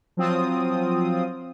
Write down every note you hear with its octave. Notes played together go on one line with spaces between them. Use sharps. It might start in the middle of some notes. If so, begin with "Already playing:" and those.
F3 F#3 C4 F4 D#6